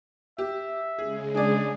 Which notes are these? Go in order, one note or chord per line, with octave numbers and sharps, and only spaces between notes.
G4 E5
C#3 G#3 G#4
D4 G#4 D5